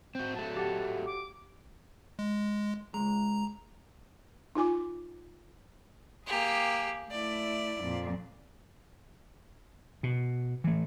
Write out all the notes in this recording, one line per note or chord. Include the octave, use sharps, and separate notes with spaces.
C4 F#4 G6
F#3 A3 A5
G4 F#5
D6
G#3
C#2 F#2 G#3 A#5
D#4 F4 G#5 D6
A#3 G4 G#4
A3 E4 D5
F2 A#2
B2
E3 A3